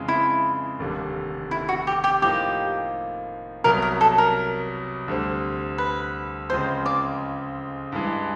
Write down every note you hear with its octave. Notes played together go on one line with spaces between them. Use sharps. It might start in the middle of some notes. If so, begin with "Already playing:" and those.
Already playing: F2 C#3 E3 G#3
E4
F1 D#2 D3 G3
E4
F#4
G4
G4
A2 F3 A#3 D#4 G4
C2 B2 F#3 A#4
A#4
A4
A#4
D2 D3 G3 C4
B4
C#2 C#3 F3 G#3 C4 C5
D5
G2 E3 G#3